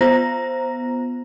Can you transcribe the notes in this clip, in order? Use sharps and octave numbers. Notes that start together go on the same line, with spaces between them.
B3 F4 C5 A#5 A#6